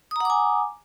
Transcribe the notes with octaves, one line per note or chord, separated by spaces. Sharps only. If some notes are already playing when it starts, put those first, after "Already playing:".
F#5 G#5 A#5 D6 D#6